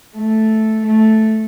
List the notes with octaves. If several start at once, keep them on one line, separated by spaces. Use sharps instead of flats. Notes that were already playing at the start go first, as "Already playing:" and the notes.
A3
A3